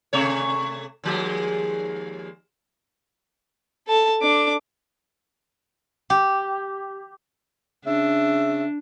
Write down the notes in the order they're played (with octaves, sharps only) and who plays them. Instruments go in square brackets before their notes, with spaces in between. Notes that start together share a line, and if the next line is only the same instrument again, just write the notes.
[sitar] C3 A3 C#5
D#2 F3 G#3
[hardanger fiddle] A4 A5
D4 D6
[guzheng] G4
[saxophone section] C#3 E5 [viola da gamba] D4